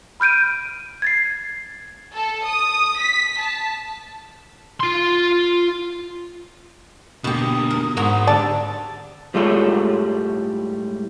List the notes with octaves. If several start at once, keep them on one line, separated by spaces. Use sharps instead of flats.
B5 F6 G6 D7 D#7
G#6 A6 C7
A4
D#6
B6
A5
F4 C6
B2 D3 A#3 G4 D#6
A#4
G#2 F#4 A#4 C5 A#5
D3 G4 D5 A5
A2 G3 G#3 F4 A4 C#5